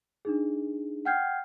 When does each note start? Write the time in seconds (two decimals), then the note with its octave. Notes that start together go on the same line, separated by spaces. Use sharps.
0.25 D4 D#4 G#4
1.05 F#5 G5 F6 G6 G#6 C7